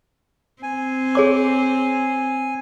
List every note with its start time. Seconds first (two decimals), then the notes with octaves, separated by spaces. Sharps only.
0.63 C4 G#5
1.15 G#4 C#5 D6